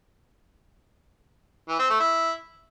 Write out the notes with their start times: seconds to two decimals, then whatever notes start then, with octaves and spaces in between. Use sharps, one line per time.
1.69 E3
1.79 C4
1.90 A3
2.00 E4